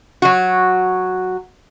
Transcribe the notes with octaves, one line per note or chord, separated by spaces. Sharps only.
F#3 F#4